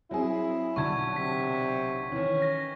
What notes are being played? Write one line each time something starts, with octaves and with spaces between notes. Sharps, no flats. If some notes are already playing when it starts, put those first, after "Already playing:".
F#3 C4 E4 G#4
B1 D3 A5 C#6 G#6
C3 B6
D#3 E3 C#4
A#6